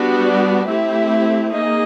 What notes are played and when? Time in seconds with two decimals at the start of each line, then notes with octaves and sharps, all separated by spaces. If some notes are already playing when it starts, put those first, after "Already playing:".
Already playing: G3 B3 D4 F#4
0.26 D5
0.68 A3 C4 E4 G4 E5
1.53 A#3 D#4 G#4 D#5